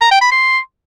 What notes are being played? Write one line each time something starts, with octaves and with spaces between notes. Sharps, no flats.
A#5
G5
B5
C6